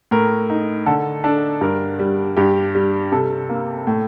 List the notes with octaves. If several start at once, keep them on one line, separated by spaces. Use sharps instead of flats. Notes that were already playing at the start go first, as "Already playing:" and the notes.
A2 A#4
D#4
D3 A4
D4 A4
G2 A#4
G3
G2 G4
G3
C3 A4
A#3
A2